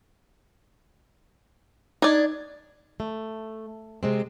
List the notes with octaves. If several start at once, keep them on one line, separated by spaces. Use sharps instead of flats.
D4 D#4 D5 G#6
A3
C3 G#3 C4